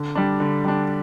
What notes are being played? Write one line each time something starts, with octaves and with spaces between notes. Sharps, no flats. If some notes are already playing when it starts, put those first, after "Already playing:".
Already playing: D3
G3 D4
D3
G3 D4